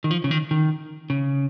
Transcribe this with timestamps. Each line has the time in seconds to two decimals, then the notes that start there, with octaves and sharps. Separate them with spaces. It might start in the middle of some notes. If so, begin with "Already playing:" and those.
0.04 D#3
0.11 F3
0.24 C#3
0.31 D#3
0.51 D#3
1.10 C#3